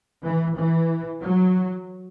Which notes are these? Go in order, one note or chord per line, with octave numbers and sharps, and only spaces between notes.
E3
E3
F#3